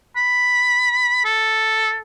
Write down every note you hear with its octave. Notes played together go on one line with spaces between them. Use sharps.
B5
A4